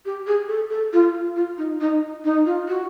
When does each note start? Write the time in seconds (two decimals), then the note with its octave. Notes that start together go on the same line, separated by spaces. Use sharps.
0.05 G4
0.27 G#4
0.48 A4
0.70 A4
0.93 F4
1.36 F4
1.58 D#4
1.81 D#4
2.24 D#4
2.46 F4
2.68 F#4